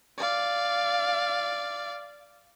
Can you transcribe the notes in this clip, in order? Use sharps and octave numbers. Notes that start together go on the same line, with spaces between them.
D5 F5